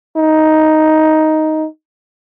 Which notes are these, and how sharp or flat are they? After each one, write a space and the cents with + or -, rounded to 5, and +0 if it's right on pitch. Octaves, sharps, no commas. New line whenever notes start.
D#4 +5